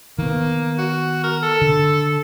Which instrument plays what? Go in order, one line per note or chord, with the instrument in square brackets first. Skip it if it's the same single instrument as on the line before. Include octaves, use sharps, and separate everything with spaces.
[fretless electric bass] D#3 B3 [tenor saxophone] A#3
[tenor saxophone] F#4
A#4
A4
[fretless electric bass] D3